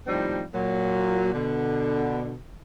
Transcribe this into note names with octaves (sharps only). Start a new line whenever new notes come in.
D#2 A2 F3 G3 C4 D#4
A#2 F#3
B2 D3